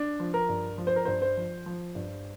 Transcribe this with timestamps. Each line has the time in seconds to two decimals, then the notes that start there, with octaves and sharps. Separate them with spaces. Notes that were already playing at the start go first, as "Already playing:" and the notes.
Already playing: D4
0.20 F3
0.34 A#4
0.49 G2
0.78 F3
0.87 C5
0.96 A#4
1.05 G2 C5
1.22 C5
1.37 F3
1.66 F3
1.95 G2